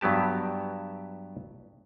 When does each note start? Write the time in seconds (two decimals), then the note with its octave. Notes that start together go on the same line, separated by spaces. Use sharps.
0.01 G2 F#3 B3 G4 A5